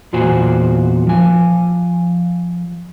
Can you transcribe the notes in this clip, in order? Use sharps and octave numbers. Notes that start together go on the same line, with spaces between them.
E2 A#2 F4 F#4 C5 G#5
F3 G#5